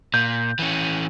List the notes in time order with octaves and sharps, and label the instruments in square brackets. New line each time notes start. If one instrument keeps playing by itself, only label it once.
[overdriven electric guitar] A#2 [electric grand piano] G6
[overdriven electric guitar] E3 C#4